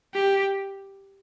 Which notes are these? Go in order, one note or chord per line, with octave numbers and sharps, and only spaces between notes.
G4